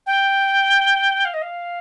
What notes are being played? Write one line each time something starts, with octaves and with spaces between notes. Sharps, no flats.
G5
F5
D#5
F5